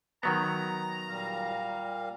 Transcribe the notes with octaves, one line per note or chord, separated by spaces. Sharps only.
D#3 F#3 B3 A#5
A#2 G3 F5